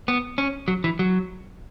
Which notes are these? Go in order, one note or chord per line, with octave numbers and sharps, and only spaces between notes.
B3
C#4
F#3
E3
F#3